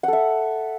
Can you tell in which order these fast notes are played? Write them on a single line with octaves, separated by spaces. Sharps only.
F#5 A4 E5